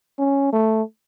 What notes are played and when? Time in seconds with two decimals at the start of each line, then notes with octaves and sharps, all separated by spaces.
0.18 C#4
0.52 A3